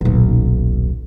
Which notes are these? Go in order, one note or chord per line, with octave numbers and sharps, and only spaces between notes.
D#1 B1